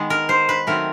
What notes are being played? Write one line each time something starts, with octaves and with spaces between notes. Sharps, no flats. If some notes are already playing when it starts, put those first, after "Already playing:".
Already playing: D#3 G#3 B3
A#4
C5
B4
D#3 F#3 A3 C4 A#4